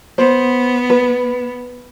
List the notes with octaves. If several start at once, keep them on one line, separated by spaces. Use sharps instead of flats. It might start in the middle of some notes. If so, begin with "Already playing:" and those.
B3 C5
B4